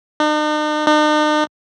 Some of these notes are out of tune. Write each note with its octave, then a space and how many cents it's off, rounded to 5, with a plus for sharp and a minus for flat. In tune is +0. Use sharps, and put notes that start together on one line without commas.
D#4 -45
D#4 -45